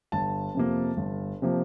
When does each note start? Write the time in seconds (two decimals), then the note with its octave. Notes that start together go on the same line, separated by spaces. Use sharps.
0.12 G1 A5
0.55 F2 C3 F3 A#3
0.97 G1
1.42 C3 F3 A#3